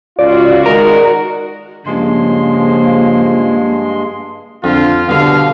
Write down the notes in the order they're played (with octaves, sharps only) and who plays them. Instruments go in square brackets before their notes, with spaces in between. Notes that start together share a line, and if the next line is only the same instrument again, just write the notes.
[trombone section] C#2 F4 [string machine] F#4 [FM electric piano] D5
[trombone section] D#3 G#3 [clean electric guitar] A#4
[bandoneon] G2 G#3 C6 [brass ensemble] C#3 F3 [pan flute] A#3
[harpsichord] F2 [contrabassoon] D3 [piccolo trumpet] F4
[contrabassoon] G2 [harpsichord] B2 D3 [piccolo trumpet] F5